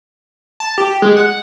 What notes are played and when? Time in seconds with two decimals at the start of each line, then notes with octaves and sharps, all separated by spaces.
0.60 A5
0.78 G4
1.02 G#3
1.17 F#5